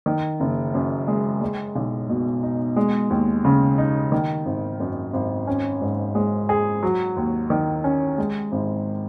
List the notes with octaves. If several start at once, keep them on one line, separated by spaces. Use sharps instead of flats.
D#3
F#1
F#2
G#3
G#3
B1
B2
D#4
G#3
D#2
C#3
D#4
D#3
G#1
F#2
G#1
C#4
G#2
G#3
G#4
F#3
D#2
D#3
C#4
G#3
G#1